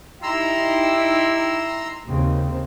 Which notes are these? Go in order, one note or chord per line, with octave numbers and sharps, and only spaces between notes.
D#4 E4 G4 A#5 C6 E6
D#2 C#3 C4